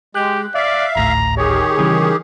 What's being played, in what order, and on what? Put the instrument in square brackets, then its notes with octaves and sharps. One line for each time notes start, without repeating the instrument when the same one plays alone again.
[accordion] G#3 [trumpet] G4 [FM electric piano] F#6
[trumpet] D5 [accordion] E5 F5
[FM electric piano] G#1 D2 A2 [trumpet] A#5
[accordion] D#3 G4 G#4 [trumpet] C#5
[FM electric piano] C#3 E3 G3